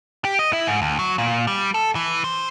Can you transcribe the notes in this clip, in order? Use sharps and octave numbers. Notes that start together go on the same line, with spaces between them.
G4
D#5
E4
G#2
D2
F#3
A#2
G3
A4
E3
C5